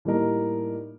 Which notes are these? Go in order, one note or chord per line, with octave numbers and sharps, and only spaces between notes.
A2 G3 A#3 D#4 A#4